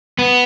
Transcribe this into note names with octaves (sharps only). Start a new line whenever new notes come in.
B3